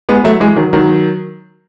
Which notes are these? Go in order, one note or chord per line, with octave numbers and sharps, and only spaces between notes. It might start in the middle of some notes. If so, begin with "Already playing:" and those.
G#3 B3
F#3 A3
E3 G#3
D#3 F#3
D#3 F#3